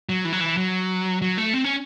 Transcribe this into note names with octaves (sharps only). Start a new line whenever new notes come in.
F#3
E3
F#3
E3
F#3
F#3
A3
C4
C#4